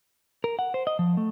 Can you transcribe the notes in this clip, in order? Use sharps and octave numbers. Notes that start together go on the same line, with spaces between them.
A#4
F#5
C5
D#5
F3
A3